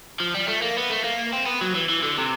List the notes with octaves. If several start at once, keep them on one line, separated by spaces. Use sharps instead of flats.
F3
G3
A3
A#3
B3
A3
A#3
C4
B3
F#3
E3
E3
D3
C3